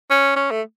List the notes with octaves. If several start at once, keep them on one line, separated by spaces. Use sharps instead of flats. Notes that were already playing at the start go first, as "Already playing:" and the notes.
C#4
C#4
A3